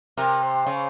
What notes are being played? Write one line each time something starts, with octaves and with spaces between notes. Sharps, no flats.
C3 A#4
C5
C#3